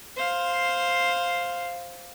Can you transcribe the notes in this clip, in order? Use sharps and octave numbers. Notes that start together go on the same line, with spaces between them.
C5 F5